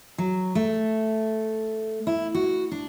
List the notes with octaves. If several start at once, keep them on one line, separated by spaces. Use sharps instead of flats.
F#3
A3
E4
F#4
D4